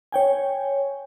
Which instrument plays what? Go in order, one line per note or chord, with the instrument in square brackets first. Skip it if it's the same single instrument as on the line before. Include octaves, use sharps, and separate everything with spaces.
[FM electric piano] C#5 G5 G#5